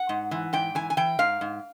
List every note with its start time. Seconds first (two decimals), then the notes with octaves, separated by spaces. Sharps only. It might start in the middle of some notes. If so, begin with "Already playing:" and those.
Already playing: F#5
0.09 G#2
0.31 E3
0.53 G#2 G5
0.75 E3 G#5
0.90 G#5
0.97 E3 G5
1.19 G#2 F5
1.41 G#2